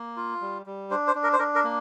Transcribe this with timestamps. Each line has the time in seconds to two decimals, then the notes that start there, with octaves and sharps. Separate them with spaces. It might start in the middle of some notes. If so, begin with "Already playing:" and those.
Already playing: A#3
0.17 F4
0.41 G3
0.66 G3
0.91 D4 C5
1.08 C5
1.15 D4
1.23 A#4
1.33 C5
1.39 D4 A#4
1.55 A#4
1.64 A#3